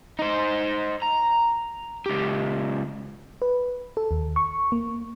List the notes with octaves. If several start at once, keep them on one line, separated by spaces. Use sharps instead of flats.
D#4 C5
A#5
C#2 G4
B4
A4
D#2
C#6
A#3